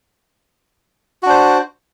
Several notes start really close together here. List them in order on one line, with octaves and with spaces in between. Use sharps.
F#4 D4 C5